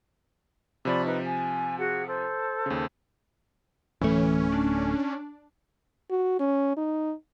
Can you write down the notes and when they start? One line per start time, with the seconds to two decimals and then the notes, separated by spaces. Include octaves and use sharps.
0.85 C3 F3 D5 B5 C#6
1.05 D#4 B4
1.24 G#5
1.77 F#4 G#4 F#5
2.06 A4 C5
2.66 D#2 C#3
4.01 D1 E3 A3 C#4
4.52 D4
6.10 F#4
6.40 C#4
6.77 D#4